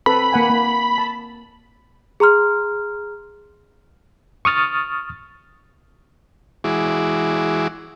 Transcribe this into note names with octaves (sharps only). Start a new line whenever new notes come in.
C4 A4 B4 B5
A#3 F#5 G#5
A#3
A5
G#4 A#5 C6 F6
C#6 D#6 F6 A6
E3 G#3 E4 F#4 G#4 D6